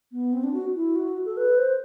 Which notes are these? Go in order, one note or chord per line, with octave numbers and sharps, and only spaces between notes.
B3
C4
D4
F#4
E4
F#4
A4
B4
C5